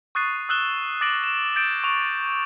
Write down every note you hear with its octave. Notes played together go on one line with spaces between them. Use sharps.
C#6 D#6 F#6 A6 C7 D#7
D#6 E6 F#6 E7 G7
D6 A6 A#6 D7 F#7
E7
G6 A6 D7 E7
C#6 F7